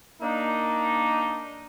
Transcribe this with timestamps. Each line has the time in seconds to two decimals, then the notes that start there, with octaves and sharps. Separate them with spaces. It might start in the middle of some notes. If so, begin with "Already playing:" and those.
0.21 A#3 D4 D#4